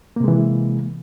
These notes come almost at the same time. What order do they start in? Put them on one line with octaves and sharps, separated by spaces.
A#3 C3 G#3 E3